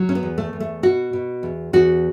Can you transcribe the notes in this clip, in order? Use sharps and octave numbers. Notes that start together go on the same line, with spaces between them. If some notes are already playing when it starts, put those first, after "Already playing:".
Already playing: F#3
C#4
B3
E2
A3
E2
A3
B2 F#4
B2
E2
E2 F#4